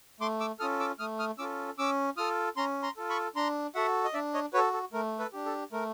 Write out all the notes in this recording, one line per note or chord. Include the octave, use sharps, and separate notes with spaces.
A3 C6 D6
D6 E6
C#4 F4 A4 D#6 F6
D6 E6
A3 D#6 F6
D#6 F6
C#4 F4 A4 D6 E6
C#4 D6 E6
F4 A4 D#6 F6
C#4 A#5 C6
A#5 C6
F4 A4
B5 C#6
D4 A#5 C6
F#4 A4 E5 F#5
D#5
D4 D5 E5
C#5 D#5
F#4 A4 B4 C#5
A4
A3 A#4
A4 B4
D4 G4
A4
A3 A#4